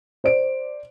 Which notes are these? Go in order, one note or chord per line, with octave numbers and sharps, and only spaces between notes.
C5 D5 D7